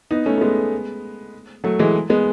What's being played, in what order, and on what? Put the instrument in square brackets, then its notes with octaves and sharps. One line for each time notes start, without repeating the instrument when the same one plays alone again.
[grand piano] B3 D#4
A3 C#4
A3
G#3 B3
F#3 A3
E3 G#3
G#3 B3